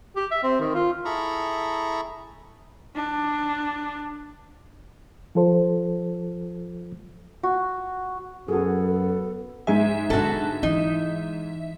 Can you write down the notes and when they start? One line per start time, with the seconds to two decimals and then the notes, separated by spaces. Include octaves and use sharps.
0.16 G4
0.31 E5
0.44 C4
0.60 D#3
0.75 F4
1.05 E4 G#4 A4 A#5 B5 C#6
2.95 D4
5.35 F3 F4 A4 C5
7.43 F#4
8.48 F#2 B3 F#4 G#4 A4
9.67 G#2 G#3 E5 G#5
10.10 D3 B3 F#4 A4
10.63 E3 D#4